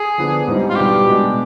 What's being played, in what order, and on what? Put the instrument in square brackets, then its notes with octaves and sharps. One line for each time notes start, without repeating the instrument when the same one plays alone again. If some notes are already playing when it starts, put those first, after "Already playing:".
Already playing: [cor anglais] G#4
[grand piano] D3 F3 B3 D4
G#2 G3 C4 D#4
[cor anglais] F4
[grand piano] B2 G3 B3 D4 [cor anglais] G4
[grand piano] B2 G#3 D4